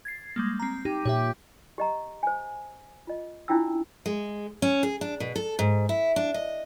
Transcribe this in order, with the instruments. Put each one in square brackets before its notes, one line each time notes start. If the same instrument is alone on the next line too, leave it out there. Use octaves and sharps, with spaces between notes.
[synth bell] G#6 A6 C7
G3 G#3 A#3
C4 A#5
[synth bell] D#4 [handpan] G4
[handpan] A#2 G4 [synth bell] C#5 E5
[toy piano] G4 D#5 A#5
C5 G#5
F4 D#5
C#4 D4 E4 F4 G5 E6
[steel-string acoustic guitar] G#3
C#4
G#4
D4
B2
A4
G#2
E4
D4
D#5